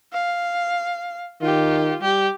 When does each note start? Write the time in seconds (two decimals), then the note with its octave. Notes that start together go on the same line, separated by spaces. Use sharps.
0.12 F5
1.42 D#3 F4 G4
2.02 G3 G4